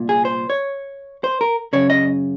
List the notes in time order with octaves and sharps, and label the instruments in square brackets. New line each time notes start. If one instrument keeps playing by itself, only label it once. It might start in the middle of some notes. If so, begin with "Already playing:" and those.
Already playing: [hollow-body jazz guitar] C2 A#2
G#4
C5
C#5
C5
A#4
F#2 C#3 C#5
D#5